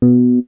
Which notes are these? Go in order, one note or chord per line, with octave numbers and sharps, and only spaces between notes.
B2